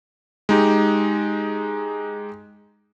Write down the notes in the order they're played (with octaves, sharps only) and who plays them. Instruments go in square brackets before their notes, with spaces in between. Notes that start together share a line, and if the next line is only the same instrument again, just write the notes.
[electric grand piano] G#3 D#4 G4